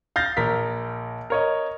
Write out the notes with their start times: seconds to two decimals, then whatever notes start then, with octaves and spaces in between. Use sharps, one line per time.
0.16 F5 G6 A6 A#6
0.37 A#1 A#4 B6
1.30 A#4 C#5 D#5